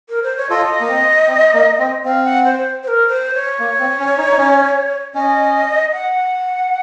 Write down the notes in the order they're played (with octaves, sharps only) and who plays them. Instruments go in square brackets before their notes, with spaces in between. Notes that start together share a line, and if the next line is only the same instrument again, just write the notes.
[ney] A#4
C5
C#5
[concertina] F4 A4 [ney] D#5
[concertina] A#3
C4
C4
A#3
C4
[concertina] C4 [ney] F5
[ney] F#5
C5
C5
A#4
C5
C#5
[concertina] A#3
C4
C#4
D#4
D#4
C#4
[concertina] C#4 [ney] D#5
[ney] F#5